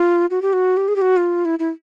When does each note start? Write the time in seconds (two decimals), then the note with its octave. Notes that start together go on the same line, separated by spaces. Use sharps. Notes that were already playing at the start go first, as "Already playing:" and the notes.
Already playing: F4
0.31 F#4
0.42 G4
0.53 F#4
0.77 G4
0.88 G#4
0.96 G4
1.01 F#4
1.17 F4
1.45 E4
1.59 E4